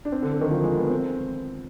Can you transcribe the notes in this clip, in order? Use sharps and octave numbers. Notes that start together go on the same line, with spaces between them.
D4
C4
D3
D3
D#3
F3
G#3
B3
C4